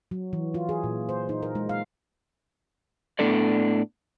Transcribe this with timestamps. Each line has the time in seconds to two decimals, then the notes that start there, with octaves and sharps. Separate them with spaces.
0.11 F#3
0.33 E3
0.54 F4
0.69 G#4
0.84 A#2
1.09 C5
1.29 D#4
1.43 A#4
1.55 G#3
1.69 F5
3.19 A2 B3 D4 A4 D5